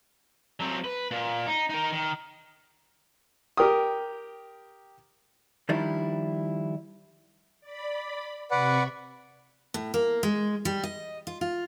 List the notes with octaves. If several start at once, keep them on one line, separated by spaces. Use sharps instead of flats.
F#3 C4
B4
A#2
D#4
D#4 A#4
D#3
G4 A#4 G5 D#6
D#3 F3 G3 D4 E4
D5 B5
C3 B4 D5 F#5 B5 C#6
A2
A#3
G#3
G3
D#5
F4
F4